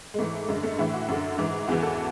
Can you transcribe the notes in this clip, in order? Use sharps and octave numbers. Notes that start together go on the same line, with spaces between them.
G#3
G#2 E3 A3
F#2 D3 G#3
A3
A2 E3 E4
F#4
F#2 D3
G#2 E3
E2 C#3 E3 F#4
A4